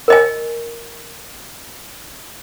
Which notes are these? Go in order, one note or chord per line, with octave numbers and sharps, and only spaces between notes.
A#4 D#5 G#5